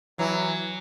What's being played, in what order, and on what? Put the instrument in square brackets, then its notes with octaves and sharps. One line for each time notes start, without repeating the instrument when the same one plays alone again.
[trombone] E3 [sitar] F#3